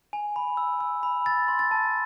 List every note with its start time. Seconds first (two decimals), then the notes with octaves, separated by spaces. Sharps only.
0.13 G#5
0.36 B5
0.57 E6
0.80 E6
1.03 B5
1.26 E6 A6
1.48 C6
1.59 A6
1.71 A5